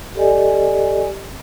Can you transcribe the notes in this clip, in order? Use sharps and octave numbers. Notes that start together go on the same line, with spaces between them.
G4 A4 D5 D#5 G#5